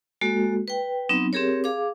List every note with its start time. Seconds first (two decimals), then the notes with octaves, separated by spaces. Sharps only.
0.21 G#3 A#3 F#4 A4
0.68 B4 G5
1.09 F#3 B3 C4 D#4
1.33 C4 G4 G#4 A#4 C#5
1.64 G#4 F5 D6